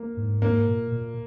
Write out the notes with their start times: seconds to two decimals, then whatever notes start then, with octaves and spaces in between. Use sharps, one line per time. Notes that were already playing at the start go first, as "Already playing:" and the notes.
Already playing: A#3
0.17 G#2
0.42 G#2 A#3
0.67 A#2
0.92 A#2